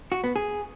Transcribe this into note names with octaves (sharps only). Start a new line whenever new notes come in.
F#4
B3
G#4